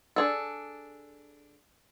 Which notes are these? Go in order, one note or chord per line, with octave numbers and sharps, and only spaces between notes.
D4 G#4 A4